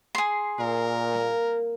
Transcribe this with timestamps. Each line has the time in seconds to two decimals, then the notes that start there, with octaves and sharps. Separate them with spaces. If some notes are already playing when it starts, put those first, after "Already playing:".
0.15 G#4 C6
0.59 A#2 A#4
1.15 A#3